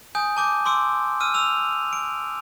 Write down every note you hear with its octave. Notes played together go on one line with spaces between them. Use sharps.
G#5 D#6 G6
A5 D6 G6
C6 D6 E6 D7
E6 F6 D#7
E6 F7
D7